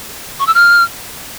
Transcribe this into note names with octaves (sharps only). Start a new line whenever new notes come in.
C#6
E6
F6